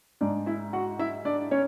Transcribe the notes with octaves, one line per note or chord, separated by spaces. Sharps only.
G#2 G#3 D4 D5
E4 E5
F#4 F#5
E4 E5
D4 D5
C#4 C#5